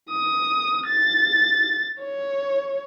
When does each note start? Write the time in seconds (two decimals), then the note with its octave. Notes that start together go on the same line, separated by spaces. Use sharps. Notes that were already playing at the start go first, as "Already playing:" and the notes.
0.10 D#6
0.87 A6
2.03 C#5